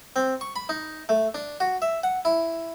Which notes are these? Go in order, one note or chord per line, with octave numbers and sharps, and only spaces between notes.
C4
C#6
B5
D#4
A3
D4
F#4
E5
F#5
E4